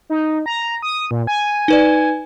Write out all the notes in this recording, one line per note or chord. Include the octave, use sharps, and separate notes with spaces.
D#4
A#5
D#6
A#2
G#5
D#4 B4 D5